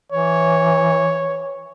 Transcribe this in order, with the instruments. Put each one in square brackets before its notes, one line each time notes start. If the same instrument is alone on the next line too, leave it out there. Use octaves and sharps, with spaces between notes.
[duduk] E3 [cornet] C#5